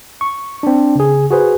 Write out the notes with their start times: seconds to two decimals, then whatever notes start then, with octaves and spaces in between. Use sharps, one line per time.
0.21 C#6
0.63 C4 D4
0.96 C#3 G#4
1.31 F#4 G#4 B4 C5